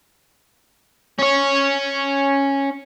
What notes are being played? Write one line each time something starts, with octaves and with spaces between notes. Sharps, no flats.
C#4 C#5